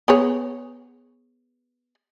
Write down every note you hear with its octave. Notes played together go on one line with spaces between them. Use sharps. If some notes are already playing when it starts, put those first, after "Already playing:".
B3 G#4 C#5